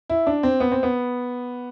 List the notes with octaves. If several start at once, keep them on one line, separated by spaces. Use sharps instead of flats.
E4
D4
C4
B3
C4
B3